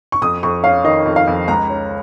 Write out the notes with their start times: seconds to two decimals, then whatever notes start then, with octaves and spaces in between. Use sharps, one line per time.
0.12 C#6
0.22 F2 D#6
0.43 F2 C#6
0.64 C#4 F5
0.84 D#3 D#5
1.06 F2
1.16 F5
1.27 F2
1.48 C#2 A#5
1.69 C#4